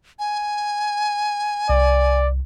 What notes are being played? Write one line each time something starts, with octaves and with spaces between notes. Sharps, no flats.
G#5
C2 D5